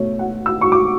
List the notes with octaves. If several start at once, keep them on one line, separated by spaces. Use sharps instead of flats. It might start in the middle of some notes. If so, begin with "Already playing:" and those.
Already playing: B2 A3 C#5
F#5
E6
C#6
D6